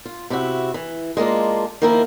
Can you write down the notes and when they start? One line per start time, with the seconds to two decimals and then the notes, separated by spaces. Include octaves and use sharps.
0.05 F4
0.30 C3 E4 F#4
0.74 E3
1.17 G#3 A#3 D4 F4
1.82 D#3 F3 A#3 E4 A#4